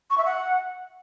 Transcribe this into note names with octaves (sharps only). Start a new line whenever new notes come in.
C#6
E5
F#5